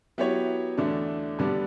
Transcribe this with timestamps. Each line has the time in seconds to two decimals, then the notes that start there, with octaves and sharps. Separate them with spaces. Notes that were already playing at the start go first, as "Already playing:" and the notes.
0.18 F#3 B3 E4 G4 C#5
0.77 E2 D3 A3 D4
1.39 G2 D3 G3 B3 D4